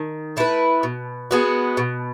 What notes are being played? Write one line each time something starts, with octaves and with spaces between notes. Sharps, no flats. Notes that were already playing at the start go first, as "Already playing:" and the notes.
Already playing: D#3
A3 E4 B4
B2
G#3 B3 F#4
B2